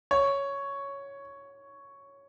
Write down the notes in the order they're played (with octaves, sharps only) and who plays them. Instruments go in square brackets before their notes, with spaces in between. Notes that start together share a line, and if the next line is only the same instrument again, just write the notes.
[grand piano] C#5